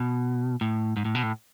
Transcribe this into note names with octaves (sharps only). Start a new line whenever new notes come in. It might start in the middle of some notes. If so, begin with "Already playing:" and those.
Already playing: B2
A2
G#2
A2
B2
A2